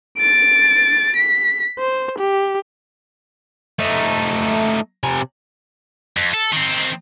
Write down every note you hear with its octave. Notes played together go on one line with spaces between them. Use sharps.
A6 D7
B6
C5
G4
A3 D#4
C3 G#5
F2
A4
D#3 C4